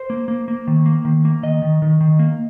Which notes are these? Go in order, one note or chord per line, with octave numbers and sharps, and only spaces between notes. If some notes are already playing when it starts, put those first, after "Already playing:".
Already playing: C5
A#3
A#3
A#3
D#3
A#3
D#3
A#3
D#3 D#5
D#3
D#3
D#3
A#3